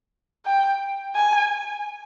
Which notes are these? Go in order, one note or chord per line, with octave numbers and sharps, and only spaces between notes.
G5
G#5